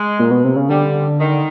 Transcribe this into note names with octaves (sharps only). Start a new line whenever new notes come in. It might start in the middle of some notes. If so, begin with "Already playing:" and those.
Already playing: G#3
A#2
B2
C3
C#3
D3 G3
D#3